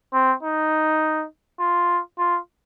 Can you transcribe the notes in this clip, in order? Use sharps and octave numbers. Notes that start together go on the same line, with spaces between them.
C4
D#4
F4
F4